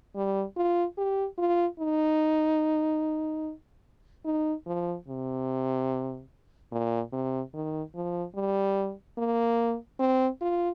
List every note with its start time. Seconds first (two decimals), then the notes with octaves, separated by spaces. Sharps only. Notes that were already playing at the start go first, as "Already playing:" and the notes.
0.16 G3
0.57 F4
0.98 G4
1.38 F4
1.80 D#4
4.25 D#4
4.67 F3
5.08 C3
6.72 A#2
7.12 C3
7.54 D#3
7.95 F3
8.36 G3
9.18 A#3
10.00 C4
10.41 F4